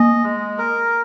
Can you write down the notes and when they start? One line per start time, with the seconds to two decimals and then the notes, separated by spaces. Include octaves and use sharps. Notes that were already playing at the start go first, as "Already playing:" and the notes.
Already playing: A#3 D#5
0.24 G#3
0.58 A#4